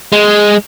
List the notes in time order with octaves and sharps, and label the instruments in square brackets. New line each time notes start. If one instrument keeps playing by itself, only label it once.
[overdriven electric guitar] G#3